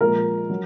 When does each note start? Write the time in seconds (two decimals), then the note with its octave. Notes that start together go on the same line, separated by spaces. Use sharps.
0.01 A#2 F3 G#3 A#4
0.50 F#3